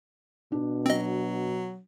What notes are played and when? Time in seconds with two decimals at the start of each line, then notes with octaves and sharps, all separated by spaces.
0.52 B2 D4
0.86 F#3 C4 D#5